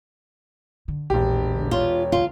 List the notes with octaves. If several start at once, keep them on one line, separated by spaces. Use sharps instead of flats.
D3
E1 A#1 G4
D3
F4 C#5
C#2 D#4 F4